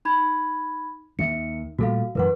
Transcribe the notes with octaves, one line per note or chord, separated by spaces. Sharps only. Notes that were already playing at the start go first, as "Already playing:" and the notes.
D#4 B5 G#6
D#2 D#3 E5 C#7
A#2 G3 A3 F#4 A4 F5
F#2 E3 A#4 B4 F#5